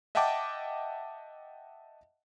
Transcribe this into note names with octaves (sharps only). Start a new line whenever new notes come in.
D#5 E5 F#5 G5 A5 D6